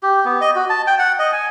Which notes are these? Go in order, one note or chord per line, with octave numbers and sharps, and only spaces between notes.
G4
B3
D#5
F#4
A5
G5
F#5
D#5
G#5